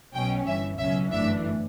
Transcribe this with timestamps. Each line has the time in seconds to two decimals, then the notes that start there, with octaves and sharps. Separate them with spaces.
0.14 B1 B2 F#3 C#4 G5
0.46 G1 G2 E3 E5
0.78 C#2 B2 F#3 C#4 E5
1.12 G1 F#2 E3 A3 D4 E5